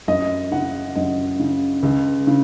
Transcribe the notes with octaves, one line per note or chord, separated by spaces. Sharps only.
F#2 D#5
C#3 F#5
F#2 D#5
C#3
C#2
C#3